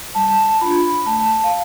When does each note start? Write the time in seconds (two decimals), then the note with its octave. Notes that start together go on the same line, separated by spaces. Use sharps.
0.15 G3 A5
0.61 D4 F4 B5
1.06 A3 A5
1.44 F5